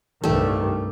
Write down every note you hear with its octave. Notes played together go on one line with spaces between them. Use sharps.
C2 G2 D#3 A3 G4